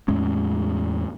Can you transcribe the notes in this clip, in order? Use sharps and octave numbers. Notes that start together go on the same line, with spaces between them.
E2 A2 G#3 C#4